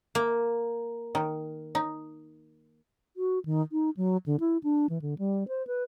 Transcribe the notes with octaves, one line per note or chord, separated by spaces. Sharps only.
A#3
D#3
D#4
F#4
D#3
D#4
F#3
D3
E4
D4
E3
D3
G3
C5
B4